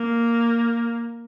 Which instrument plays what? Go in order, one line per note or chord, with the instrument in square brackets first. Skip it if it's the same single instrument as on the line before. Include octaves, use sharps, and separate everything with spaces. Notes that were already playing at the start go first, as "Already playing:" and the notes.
Already playing: [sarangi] A#3